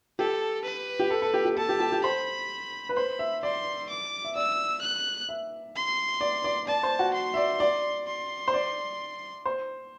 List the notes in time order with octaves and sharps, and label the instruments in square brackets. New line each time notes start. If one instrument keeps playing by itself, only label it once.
[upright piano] G4 [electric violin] A4
[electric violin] B4
[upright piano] G4
A4
A4
G4
G4
[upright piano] A4 [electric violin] A5
[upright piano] G4
G4
G4
[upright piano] C5 [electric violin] B5
[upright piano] B4
[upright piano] C5 [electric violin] B5
[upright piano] E5
[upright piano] D5 [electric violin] C6
[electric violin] D6
[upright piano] E5
[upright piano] D5 [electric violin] E6
[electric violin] F#6
[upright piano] E5
[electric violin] C6
[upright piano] D5
D5
[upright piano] D5 [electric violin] A5
[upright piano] C5
F#4
[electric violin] C6
[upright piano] E5
D5
D5
[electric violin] C6
[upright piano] C5
D5
C5